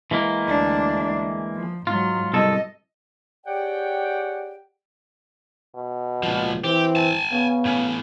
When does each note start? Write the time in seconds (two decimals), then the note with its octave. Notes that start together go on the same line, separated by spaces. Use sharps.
0.11 E3 G#3 A#3
0.46 D2 D4
1.55 F3
1.87 G#2 F#3 F4
2.34 C2 A4 D#5
3.46 G4 G#4 C#5 D5 F#5 G5
5.75 B2
6.23 C#2 A#2 F3
6.64 E3 C4 G4
6.96 G#5 A5
7.32 C#3 B3
7.65 A2 C#4